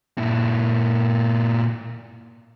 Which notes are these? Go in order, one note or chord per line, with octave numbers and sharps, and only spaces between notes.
A#2 E4